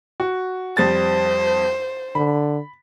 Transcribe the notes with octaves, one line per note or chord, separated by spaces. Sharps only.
F#4
F2 G3 C5 A6
D3 B5